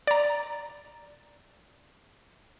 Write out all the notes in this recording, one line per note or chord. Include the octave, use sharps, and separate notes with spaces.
D5 A#5